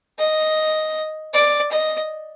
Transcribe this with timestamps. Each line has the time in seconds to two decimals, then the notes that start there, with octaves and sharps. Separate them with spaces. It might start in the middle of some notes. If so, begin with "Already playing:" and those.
0.19 D#5
1.33 D5
1.72 D#5